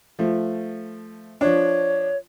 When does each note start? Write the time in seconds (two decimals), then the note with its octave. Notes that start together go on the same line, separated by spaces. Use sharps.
0.19 F3 A3
1.41 F3 D4 C#5